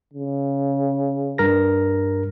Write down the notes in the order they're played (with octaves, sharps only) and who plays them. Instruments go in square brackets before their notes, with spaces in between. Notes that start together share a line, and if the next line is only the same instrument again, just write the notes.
[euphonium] C#3
[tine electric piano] G2 A#4 A#6